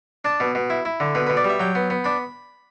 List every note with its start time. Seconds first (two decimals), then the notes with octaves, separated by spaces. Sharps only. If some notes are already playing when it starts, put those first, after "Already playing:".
0.25 D4 A5
0.40 B2
0.55 B2
0.70 E4
0.85 E4
1.00 D3
1.15 B2 B4
1.27 B2 B4
1.37 D5
1.45 G3 E5
1.60 F#3 G5
1.75 B3
1.90 B3
2.04 D4 B5